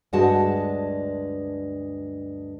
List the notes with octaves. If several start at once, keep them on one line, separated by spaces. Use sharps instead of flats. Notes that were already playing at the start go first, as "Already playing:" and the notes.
D2 G2 G#3 D4 F#4 A5